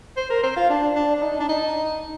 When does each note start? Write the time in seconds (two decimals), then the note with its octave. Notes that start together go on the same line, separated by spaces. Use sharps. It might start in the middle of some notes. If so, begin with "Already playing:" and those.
0.17 C5
0.30 A#4
0.43 C5
0.56 F4
0.70 D4
0.95 D4
1.15 D4
1.22 D#4
1.40 D4
1.49 D#4